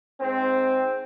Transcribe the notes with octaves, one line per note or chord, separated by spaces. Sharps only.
G#2 C4